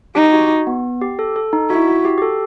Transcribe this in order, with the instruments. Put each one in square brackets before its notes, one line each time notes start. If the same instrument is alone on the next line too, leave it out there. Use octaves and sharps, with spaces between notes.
[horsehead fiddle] D#4 [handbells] G4
[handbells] F#4
B3
G4
A4
A4
D#4
[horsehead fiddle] E4 [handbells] F#4
[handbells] F#4
G4
G4
A4